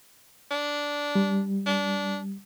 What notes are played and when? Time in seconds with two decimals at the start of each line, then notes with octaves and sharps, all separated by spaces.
0.51 D4
1.15 G3
1.66 D4